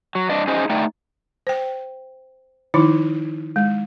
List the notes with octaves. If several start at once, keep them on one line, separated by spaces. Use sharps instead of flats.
F#3
G2 D4 D5 D#5
C#4 D#4 G#4 C5 D#5
A3 D#4 D5 G5
C5 G5
D#3 F3 D#4 E4
G#3